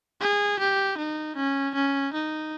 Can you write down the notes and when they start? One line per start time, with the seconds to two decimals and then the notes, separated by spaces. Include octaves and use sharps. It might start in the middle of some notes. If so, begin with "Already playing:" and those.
0.21 G#4
0.59 G4
0.98 D#4
1.36 C#4
1.75 C#4
2.13 D#4